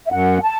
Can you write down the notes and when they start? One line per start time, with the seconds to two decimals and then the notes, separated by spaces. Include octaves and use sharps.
0.06 E5
0.11 F#2 F#5
0.42 A5